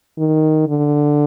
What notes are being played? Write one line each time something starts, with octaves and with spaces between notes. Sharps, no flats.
D#3
D3